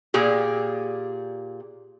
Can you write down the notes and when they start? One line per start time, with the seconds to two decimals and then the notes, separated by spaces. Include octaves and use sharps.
0.14 A#2 G4 G#4